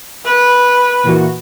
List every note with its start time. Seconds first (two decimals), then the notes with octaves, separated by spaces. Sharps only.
0.25 B4
1.03 A#2 E3 F#4